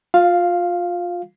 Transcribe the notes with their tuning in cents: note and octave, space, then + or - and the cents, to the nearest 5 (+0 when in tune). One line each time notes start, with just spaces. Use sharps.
F4 +25 F5 +0